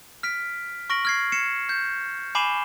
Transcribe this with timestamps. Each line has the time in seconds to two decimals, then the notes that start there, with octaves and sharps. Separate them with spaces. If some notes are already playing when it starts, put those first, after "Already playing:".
0.23 F6 B6 D7
0.90 C#6 F6 A#6 D7 F#7
1.05 F6 G#6 C7
1.32 G#6 C7 C#7 E7
1.69 G6
2.35 G#5 B5 D6 C7 E7 G7